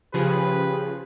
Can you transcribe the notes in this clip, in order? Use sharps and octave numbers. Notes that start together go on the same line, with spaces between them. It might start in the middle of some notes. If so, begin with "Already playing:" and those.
C#3 F3 G4 G#4 B4